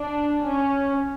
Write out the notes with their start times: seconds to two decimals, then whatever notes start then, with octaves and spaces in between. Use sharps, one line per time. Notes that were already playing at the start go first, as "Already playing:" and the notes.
Already playing: D4
0.45 C#4